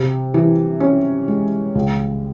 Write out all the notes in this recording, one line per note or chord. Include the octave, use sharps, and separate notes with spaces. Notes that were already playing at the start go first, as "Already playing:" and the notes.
Already playing: C3
E3
C#4
G#3
C#2